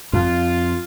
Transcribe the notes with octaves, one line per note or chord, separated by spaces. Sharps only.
F2 F4